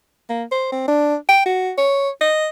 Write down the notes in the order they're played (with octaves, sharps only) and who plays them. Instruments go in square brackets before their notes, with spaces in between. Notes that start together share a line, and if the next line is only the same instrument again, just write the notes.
[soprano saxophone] A#3
C5
C4
D4
G5
F#4
C#5
D#5